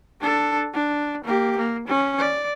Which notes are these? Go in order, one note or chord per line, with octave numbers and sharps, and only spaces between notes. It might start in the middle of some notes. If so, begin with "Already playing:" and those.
D4 A4
D4
A#3 G4
A#3
C#4
D5